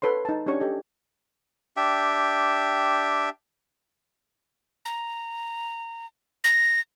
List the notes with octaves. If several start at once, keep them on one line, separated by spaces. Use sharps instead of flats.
A4 B4 C#5 C6
D#4 A5
C#4 D4 G4 C#5 C#6
G4 A4 D#5
D4 G4 E5 G5
A#5
A#6